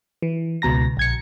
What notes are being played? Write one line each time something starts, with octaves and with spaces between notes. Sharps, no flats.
E3
C#2 B2 A#5 A#6
A#1 G#6 C#7